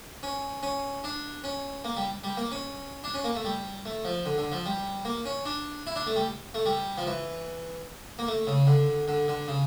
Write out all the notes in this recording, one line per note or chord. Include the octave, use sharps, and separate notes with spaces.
C#4
C#4
D4
C#4
A#3
G3
G3
A#3
C#4
D4
C#4
A#3
A3
G3
A3
F3
D3
D3
F3
G3
A#3
C#4
D4
E4
D4
A3
G3
A3
G3
F3
E3
A#3
A3
C#3
D3
D3
D3
C#3